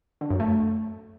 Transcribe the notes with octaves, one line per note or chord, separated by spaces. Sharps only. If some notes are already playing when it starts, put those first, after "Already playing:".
D3
F#2
A3